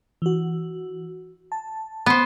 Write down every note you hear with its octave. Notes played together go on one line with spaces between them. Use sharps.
E3 F#4
A5
B3 C5